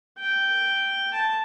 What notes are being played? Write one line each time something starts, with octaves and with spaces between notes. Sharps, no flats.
G5
A5